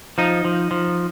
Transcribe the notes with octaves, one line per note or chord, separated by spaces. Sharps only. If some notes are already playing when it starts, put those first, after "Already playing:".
F3 D#4
F3
F3